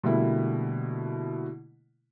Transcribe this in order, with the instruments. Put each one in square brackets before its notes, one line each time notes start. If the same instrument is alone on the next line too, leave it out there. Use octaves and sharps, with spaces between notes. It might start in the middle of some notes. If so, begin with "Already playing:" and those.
[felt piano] B2 D3 G3 A3 A#3 E4